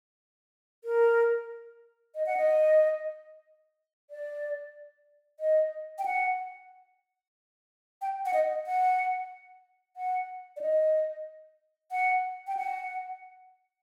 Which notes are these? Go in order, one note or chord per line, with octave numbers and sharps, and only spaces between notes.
A#4
D#5
F#5
D#5
D5
D#5
G5
F#5
G5
F#5
D#5
F#5
F#5
D5
D#5
F#5
G5
F#5